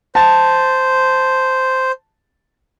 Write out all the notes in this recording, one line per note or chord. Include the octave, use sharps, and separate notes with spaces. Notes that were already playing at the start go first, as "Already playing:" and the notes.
C5 A5